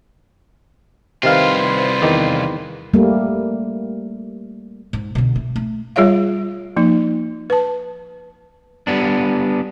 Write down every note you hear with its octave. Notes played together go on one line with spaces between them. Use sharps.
C2 C3 D#3 F4 B4 C5 F5
E2 D#3
G3 A3 A#3
G#2
B2 D3
A3
A3
G3 F4 G#4 C#5 E5 F5
F3 A#3 D#4
B4 A5
G3 B3 D4